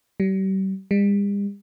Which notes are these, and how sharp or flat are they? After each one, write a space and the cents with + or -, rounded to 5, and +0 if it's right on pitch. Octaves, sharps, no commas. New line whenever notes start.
G3 -35
G3 +45